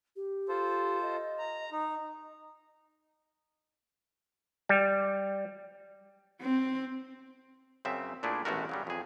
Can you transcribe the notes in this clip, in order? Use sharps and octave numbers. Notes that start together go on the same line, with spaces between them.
G4
F4 A4 C5
D#5
A#5
D#4
G3
C4
F#2 C#3 C4 E5
A#2 A3 D4 E4 G#4
A1 B2 G#3 A3 F#4 A#4
C#3 F#3 G3
F2 G#4